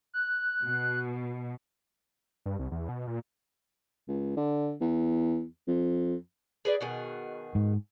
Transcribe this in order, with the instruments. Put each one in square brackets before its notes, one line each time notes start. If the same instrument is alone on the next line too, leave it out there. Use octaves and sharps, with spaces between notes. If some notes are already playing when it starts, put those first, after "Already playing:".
[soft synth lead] F#6
[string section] B2
[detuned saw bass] G2
C2
E2
B2
A#2
[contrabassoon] C#2
D3
E2
F2
[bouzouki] G#4 B4 D5
B2 D#3 G#4
[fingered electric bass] G#2